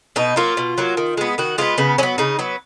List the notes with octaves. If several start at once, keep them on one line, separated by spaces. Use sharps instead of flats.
B2 D#4
F#3 A#3 F4
B2
F#3 A#3
D#3
G#3 B3
D#3 F#4
G#3 B3 F4
C#3 B3
F#3 B3 C#4
C#3 D#4
F#3 B3